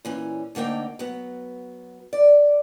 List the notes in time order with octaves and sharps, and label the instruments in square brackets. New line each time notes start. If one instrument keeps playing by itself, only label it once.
[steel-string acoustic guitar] A#2 E3 C#4
D2 D3 A#3 D#4 G5
F#3 B3
D5